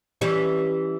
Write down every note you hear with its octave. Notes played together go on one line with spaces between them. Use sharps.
E3 G3 C#4